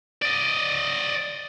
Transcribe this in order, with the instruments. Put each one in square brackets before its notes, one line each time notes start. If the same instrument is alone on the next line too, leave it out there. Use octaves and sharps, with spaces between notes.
[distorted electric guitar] D5 D#5